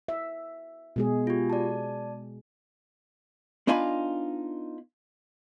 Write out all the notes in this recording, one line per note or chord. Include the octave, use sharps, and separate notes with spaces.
E5
B2 G#3 G#4
F4 G4
D5 A5
B3 D4 D#4 F4 G#5 B5